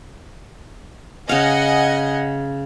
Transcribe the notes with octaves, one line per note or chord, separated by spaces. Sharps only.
C#3 D#5 F5 F#5 G#5